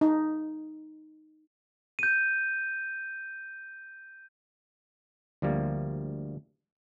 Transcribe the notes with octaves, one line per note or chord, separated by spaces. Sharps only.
D#4
G6 D#7
D2 F3 G3 A#3